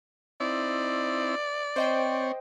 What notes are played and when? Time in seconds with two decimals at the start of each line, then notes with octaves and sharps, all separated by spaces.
0.40 C4 D#4 E4 D5
1.76 C4 C5 C#5 D#5 G5